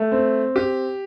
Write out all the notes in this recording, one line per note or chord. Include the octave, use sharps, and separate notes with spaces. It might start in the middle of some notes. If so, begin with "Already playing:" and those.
Already playing: A3
C4
G4